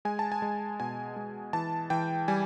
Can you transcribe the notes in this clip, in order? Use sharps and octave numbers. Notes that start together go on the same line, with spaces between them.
G#3 G#5
A5
G#5
G#3
B2 G#5
G#3
E3 A5
E3 G5
G3 G#5